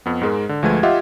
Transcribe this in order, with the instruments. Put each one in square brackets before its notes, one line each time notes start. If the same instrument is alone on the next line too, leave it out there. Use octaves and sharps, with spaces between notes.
[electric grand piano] F2 B3
G#2 G#3 A#4
D3
D2 F3 G#3 A3 B4 G#6
F4 G4 D#5 E5 F#5